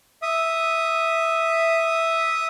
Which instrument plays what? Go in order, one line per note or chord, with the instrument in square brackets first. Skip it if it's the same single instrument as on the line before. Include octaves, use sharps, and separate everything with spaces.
[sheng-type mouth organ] E5 D#6